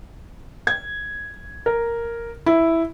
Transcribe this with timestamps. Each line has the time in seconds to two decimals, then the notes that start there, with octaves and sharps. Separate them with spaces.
0.67 G#6
1.66 A#4
2.46 E4